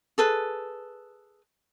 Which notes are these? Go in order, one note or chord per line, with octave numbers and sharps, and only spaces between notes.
G#4 A4 B4